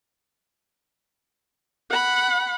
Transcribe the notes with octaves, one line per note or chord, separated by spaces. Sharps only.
F#5 B5